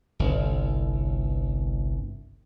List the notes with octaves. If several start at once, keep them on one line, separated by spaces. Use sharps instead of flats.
G1 C2